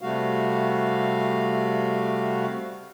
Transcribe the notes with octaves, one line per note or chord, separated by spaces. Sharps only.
C3 G3 A3 F#4 F5